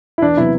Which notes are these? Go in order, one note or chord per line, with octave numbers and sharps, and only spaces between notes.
E4
E2 D4
C3 F#3 B3 E4 F#4